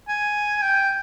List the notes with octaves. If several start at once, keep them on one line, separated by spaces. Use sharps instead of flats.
G#5
G5